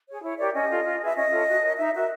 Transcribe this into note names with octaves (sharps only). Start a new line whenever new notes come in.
G#4 C#5
E4 C#5
G4 A#4 C#5 D5
C#4 D#5
F4 A4
F4
G#4 B4 E5
C#4 D#5
F4 A4 C#5
F#4
A#4 C#5
D#4 E5
F#4 A#4 E5